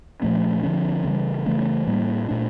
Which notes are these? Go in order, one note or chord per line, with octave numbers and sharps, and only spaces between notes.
A#2 F3 A3 C#4
D3 F3 C#4
C#3 E3 G3
C#3 E3 A3 C#4
A2 G3 A#3
A#2 A3 D4